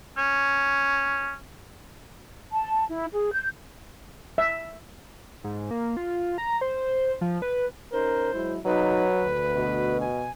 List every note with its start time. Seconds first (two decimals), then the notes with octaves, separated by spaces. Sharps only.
0.17 C#4
2.52 A5
2.88 E4
3.12 G#4
3.32 G6
4.38 E5
5.44 G#2
5.71 A#3
5.97 F4
6.38 A#5
6.61 C5
7.21 F3
7.42 B4
7.92 C#4 D#4 A#4 C5
8.33 F#3 G#3 E4
8.65 G#1 F#3 D#4 B4
9.24 D2
9.56 B2
10.00 G#5